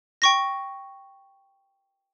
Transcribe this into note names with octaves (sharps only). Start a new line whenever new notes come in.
G5 C#6 A#6